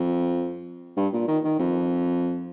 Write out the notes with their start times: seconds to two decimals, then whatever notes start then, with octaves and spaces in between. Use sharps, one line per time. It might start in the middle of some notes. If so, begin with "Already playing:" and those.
Already playing: F2
0.97 G2
1.13 A#2
1.28 D#3
1.44 D#3
1.59 F2